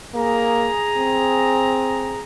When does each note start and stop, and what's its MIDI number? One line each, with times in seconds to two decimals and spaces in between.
0.14 0.69 58
0.14 2.22 68
0.14 2.22 82
0.97 2.19 60